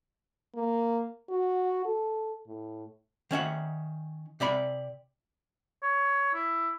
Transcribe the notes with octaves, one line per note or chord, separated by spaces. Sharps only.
A#3
F#4
A4
A2
D#3 C#4 E5 F#5
C3 D5 E5 B5
C#5
E4